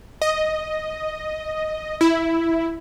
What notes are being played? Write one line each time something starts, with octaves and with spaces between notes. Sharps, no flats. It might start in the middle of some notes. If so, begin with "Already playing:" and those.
D#5
E4